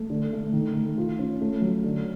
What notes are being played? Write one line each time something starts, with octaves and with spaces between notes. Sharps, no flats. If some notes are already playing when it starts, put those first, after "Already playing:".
Already playing: A3
D3
A3
D#3
A3
F4
C#4
A3
F#3
D3